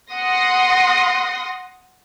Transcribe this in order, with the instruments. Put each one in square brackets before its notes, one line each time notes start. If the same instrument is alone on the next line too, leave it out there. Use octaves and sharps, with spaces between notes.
[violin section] F#5 C6 D#6 A#6